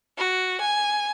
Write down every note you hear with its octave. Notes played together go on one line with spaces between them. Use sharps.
F#4
G#5